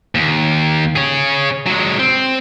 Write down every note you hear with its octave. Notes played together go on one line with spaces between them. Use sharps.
D#2
G#4 C#5
F#3 G#3
C4